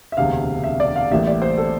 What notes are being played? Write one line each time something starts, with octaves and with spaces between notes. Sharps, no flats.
E5
E1 D2 C3 F5
E5
D5
F5
A1 A2 G3 A#3 E5
D5
C5
A4